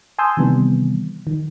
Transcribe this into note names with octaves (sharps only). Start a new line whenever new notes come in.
G#5 A5 C6 D#6 E6 G6
C3 D#3 E3 G3 B3
D#3